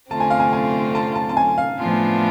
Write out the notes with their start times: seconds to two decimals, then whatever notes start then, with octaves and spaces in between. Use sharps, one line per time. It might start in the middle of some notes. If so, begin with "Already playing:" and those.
0.10 D3 A3 C4 F4 A5
0.20 G#5
0.30 F5
0.40 G#5
0.53 G#5
0.95 A5
1.15 A5
1.29 A5
1.37 G#5
1.58 F5
1.78 A2 F3 B3 D4 F4